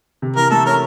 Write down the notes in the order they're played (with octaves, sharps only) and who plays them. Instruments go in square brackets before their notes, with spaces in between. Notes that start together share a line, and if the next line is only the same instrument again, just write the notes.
[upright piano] C3
[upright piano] E3 [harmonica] A#4
[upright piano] A3 [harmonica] A4
[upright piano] C#4 [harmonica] A#4